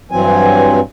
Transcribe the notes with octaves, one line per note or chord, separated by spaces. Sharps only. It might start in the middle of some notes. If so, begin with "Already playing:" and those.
G2 E3 F#3 C4 G#5